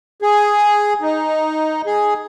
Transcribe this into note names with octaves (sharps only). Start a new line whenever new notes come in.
G#4
D#4
G#4